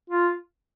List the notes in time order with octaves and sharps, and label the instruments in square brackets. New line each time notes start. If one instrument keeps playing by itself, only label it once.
[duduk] F4